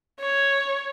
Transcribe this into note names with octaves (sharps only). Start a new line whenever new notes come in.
C#5